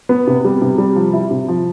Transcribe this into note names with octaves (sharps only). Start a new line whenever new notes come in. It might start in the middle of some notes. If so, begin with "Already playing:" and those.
B3
C3
G3
C3
G3
F3
E4
C3
F3